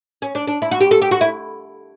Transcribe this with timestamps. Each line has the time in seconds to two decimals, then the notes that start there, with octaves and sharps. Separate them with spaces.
0.22 C#4
0.35 D4
0.47 D4
0.62 E4
0.71 F#4
0.81 G4
0.91 A4
1.02 G4
1.11 F#4
1.21 E4